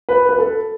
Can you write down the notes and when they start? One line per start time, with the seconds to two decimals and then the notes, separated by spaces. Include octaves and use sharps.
0.09 B4
0.29 B4
0.39 A4